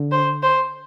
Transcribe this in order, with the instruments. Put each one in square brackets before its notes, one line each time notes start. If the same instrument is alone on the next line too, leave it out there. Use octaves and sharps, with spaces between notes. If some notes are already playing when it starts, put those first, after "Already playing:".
Already playing: [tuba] D3
[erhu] C5
C5